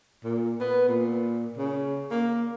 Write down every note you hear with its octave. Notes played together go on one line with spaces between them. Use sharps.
A#2
B3
A#2
C#3
A#3